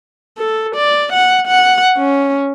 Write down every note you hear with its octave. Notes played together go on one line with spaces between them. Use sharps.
A4
D5
F#5
F#5
C#4